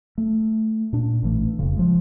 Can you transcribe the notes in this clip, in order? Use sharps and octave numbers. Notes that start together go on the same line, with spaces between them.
A3
A#2 D4
A1 E3 A3
E1 F2 C#3
F3 G#3